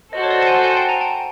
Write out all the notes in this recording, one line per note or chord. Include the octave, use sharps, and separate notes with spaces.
F#4 A4 C5 D#5
C#5
D5
A5
F#5 G#5
F#5 G#5
G5 A5
G#5 A#5
G5 A5